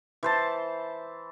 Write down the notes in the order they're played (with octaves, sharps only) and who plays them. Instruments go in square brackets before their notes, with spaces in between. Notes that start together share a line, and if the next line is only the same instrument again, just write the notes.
[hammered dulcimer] E3 C5 A5